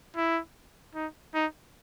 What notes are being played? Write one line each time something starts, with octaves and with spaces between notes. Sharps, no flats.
E4
D#4
D#4